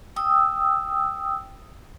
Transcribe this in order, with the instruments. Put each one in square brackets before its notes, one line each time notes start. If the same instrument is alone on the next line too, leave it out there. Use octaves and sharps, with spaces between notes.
[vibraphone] G5 D#6 E6